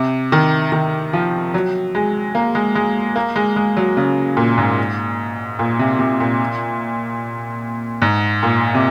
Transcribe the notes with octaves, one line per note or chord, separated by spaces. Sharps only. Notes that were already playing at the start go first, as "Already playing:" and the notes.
Already playing: C3
D#3
D#3
F3
F#3
G#3
A#3
G#3
G#3
A#3
G#3
G#3
F#3
C#3
A#2
G#2
A#2
C3
C3
A#2
G#2
A#2
C3